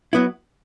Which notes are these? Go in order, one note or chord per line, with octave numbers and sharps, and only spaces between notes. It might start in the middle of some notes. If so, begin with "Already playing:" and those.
F#3 B3 E4